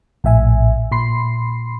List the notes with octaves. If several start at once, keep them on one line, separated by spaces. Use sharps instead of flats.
A#1 A2 E5 G#5
A#2 B5 C6 C7